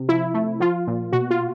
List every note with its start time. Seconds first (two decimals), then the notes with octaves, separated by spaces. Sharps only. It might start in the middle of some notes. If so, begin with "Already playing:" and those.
Already playing: C3
0.08 F3 E4
0.34 A3
0.60 F3 F4
0.87 A#2
1.12 B2 F#4
1.31 F4